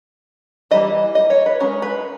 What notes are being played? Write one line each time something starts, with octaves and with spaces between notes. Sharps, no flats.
E3 G3 A#3 D#5
D#5
C#5
B4
G#3 C#4 A#4
B4